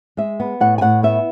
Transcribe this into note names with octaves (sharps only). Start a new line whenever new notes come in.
G#3 E5
B3
A2 F#5
G#5
A2 F#5
B3 E5